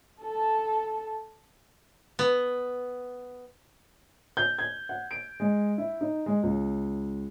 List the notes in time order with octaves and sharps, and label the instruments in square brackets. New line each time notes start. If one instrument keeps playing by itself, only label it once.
[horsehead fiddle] A4 A5
[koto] B3
[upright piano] G6
G#6
F#5
D7
G#3
E4
D#4
G#3
C#2